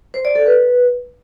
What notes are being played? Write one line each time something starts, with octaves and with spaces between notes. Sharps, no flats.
C5
D5
A4
B4